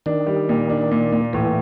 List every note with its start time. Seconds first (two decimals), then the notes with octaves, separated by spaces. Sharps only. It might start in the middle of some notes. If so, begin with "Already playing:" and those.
0.06 D#3 D4
0.27 G3
0.49 A#2
0.70 D4
0.91 A#2
1.12 A#2
1.33 A2 E3